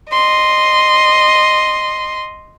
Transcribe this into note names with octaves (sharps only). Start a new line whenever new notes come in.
D#5 C6